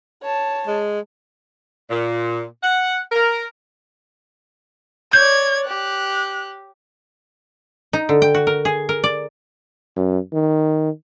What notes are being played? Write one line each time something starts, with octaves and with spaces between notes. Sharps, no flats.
C#5 A5
G#3
A#2
F#5
A#4
C#5 D5 G6 G#6
G4 F#6
D#4
D3
G5
F#4
A#4
G#4
A#4
D5
F#2
D#3